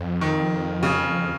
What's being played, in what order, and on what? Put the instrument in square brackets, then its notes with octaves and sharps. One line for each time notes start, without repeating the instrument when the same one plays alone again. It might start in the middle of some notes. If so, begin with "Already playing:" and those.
Already playing: [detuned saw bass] F2
[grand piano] D#3
C#3